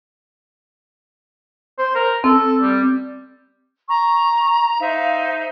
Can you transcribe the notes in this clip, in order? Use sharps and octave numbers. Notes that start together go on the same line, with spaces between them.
C5
A#4
C4 A4
G3
A#5 C#6
D#4 C5 E5 F5